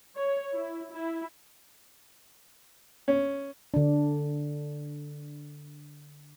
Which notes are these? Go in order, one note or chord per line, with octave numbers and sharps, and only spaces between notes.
C#5
E4
E4
C#4
D3 D4